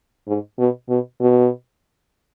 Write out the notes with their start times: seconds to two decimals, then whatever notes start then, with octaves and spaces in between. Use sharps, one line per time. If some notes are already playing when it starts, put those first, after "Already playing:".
0.27 G#2
0.59 B2
0.89 B2
1.21 B2